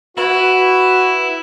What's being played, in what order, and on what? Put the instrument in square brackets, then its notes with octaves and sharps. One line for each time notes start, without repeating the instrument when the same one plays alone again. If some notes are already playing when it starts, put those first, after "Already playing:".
[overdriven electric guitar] E4 [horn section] F#4 B4